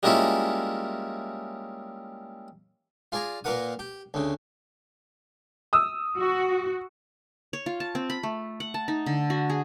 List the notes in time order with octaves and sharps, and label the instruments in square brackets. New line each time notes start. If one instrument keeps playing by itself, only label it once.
[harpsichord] G3 G#3 A#3 C#4 E4 F4
F4 G#4 D5 G#5 A#5
A#2 A#3 A#4 B4 F#5 D#6
G4
D2 C#3
[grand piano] D#6 E6
[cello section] F#4
[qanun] C#5
F4
A5
C4
B5
A3
F#5
A5
D#4
D3
F#4
G#4